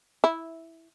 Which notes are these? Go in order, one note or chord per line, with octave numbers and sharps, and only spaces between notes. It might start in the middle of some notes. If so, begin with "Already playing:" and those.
E4